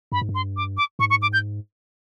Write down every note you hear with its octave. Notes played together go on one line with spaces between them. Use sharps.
G2 B5
G#2
G2
C6
D6
D6
G#2 C#6
C#6
D6
G6